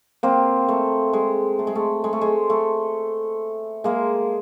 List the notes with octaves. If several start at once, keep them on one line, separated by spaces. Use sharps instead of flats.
A#3 C4
A3
G#3
A3
G#3
A3
G#3
A3
G#3
A3
G#3 A#3